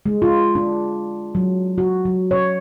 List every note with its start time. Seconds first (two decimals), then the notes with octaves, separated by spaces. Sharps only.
0.06 G#3
0.22 F4
0.55 D4
1.35 F#3
1.78 F#4
2.05 F#3
2.31 C#5